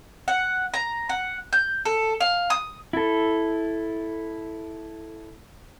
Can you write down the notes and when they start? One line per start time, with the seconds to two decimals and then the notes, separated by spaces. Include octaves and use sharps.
0.28 F#5
0.74 A#5
1.09 F#5
1.53 G6
1.85 A4
2.21 F5
2.50 D#6
2.93 E4 A4